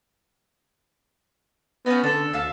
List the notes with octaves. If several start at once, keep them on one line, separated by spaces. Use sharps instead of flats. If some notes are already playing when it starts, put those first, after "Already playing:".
B3 C#4 D#4
D3 D4 A4
D2 E5 F5 A5